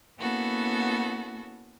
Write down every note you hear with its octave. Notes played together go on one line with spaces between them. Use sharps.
A#3 B3 C#4 E4 F#4 A4